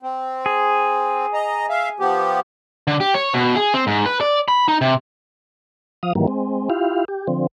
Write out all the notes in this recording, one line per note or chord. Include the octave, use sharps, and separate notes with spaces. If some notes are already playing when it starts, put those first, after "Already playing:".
C4
G#4
D#5 A#5
E5 F5
F3 B3 G4
D3
G4
C#5
B2
G#4
C4
G#2
B4
D5
B5
D#4
C3
F3 F5 D#6
G#2 D#3 E3 F#3 G3 A#3
G#3 C4
E4 F4 G4 F5
G4
D3 F3 C4